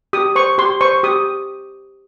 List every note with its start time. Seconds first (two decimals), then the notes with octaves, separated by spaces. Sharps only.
0.13 G4 D#6
0.36 C5 C#6
0.58 G4 C6
0.81 C5 C#6
1.03 G4 D#6